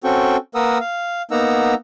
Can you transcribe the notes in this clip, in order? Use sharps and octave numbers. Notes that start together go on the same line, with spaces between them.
C4 C#4 F#4 A4 G5 C#6
A#3 A#4 B4 F#5 D#6 E6
F5
A#3 B3 D#4 F#5 A#5 E6